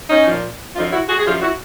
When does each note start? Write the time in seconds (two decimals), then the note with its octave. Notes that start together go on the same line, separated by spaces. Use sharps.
0.09 C#4 D#4
0.26 A#2 F3
0.75 F#2 D3 F3 D#4 F4
0.92 E4 F#4
1.08 F#4 G#4
1.19 G#4
1.25 F#2 D3 F3 F4 G4
1.42 E4 F#4